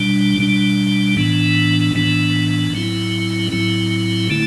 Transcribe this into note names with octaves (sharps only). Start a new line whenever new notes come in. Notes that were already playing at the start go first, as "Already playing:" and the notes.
Already playing: B2 G3 D4
B2 G3 D4
A2 E3 B3 D4
A2 E3 B3 D4
A2 F#3 C4 E4
A2 F#3 C4 E4
D3 A3 E4